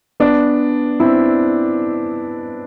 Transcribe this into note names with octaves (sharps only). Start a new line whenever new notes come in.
B3 D4
C4 E4